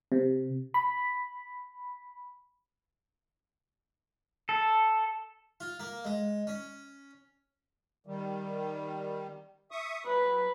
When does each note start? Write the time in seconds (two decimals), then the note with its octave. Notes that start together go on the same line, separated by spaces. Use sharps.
0.12 C3
0.74 B5
4.49 A4
5.60 F4
5.80 A#3
6.05 G#3
6.47 C#4
8.07 D#3 G3
9.71 E5 C#6 D#6
10.06 F#3 B4